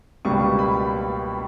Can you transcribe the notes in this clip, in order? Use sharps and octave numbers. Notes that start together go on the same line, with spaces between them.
C#2 B2 G3 A#3 C#6
B5